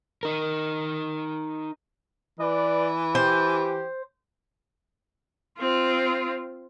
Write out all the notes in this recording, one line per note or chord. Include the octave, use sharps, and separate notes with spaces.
D#4 A#4
E3 B4 D5
G4 C5
C4 F4